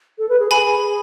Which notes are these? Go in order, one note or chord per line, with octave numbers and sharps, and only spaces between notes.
A4
B4
G#4
G#4 G#5 B5